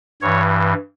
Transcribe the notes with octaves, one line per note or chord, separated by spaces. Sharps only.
G2 E3 C#5